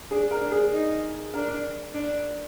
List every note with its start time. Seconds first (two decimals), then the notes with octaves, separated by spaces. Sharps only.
0.11 D4 G#4
0.31 A#4
0.41 D4
0.51 G#4
0.73 D#4
1.34 D4 A#4
1.95 D4